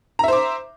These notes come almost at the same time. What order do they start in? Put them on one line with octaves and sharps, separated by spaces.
A#5 E5 C5 D6